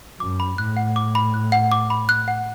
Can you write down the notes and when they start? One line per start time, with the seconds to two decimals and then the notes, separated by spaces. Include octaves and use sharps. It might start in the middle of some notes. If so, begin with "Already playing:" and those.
0.20 F#2 D6
0.40 B5
0.58 A2 F#6
0.77 F#5
0.96 D6
1.15 B5
1.34 F#6
1.52 F#5
1.72 D6
1.90 B5
2.09 F#6
2.28 F#5